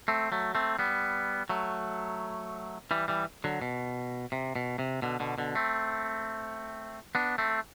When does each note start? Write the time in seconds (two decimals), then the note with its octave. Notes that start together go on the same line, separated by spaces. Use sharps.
0.08 A3 C4
0.32 F#3 A3
0.55 A3 C4
0.79 G3 B3
1.50 F#3 A3
2.91 E3 G3
3.08 E3 G3
3.44 D3 F#3
3.62 B2
4.32 C3
4.56 B2
4.79 C3
5.02 B2 D3
5.20 B2 D3
5.38 B2 D3
5.55 A3 C4
7.15 B3 D4
7.38 A3 C4